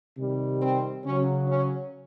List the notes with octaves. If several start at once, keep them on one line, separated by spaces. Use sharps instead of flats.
C3 D#3 G3
C4
C#3 F#3 C#4
C#4